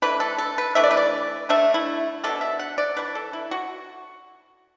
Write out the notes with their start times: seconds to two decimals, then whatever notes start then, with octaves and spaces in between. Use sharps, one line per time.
0.02 E3 A3 D4 B4
0.20 A4
0.38 A4
0.58 B4
0.75 E3 A3 D4 E5
0.84 D5
0.91 B4
0.97 D5
1.49 D3 A3 D4 E5
1.74 E4
2.24 A3 D4 A4
2.27 B2
2.41 E5
2.59 F#5
2.78 D5
2.96 E3 D4 B4
3.15 A4
3.33 E4
3.51 F#4